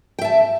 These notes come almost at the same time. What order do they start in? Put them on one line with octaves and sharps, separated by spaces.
G5 E5 A5